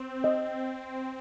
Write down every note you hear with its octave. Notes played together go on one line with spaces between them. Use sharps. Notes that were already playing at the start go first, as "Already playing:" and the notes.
Already playing: C4
D#5